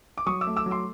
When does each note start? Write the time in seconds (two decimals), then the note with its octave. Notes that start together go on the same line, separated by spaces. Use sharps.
0.18 D6
0.26 F#3 C#6 D#6
0.41 D6 E6
0.47 A3
0.56 D6 E6
0.66 F#3
0.71 C6 D6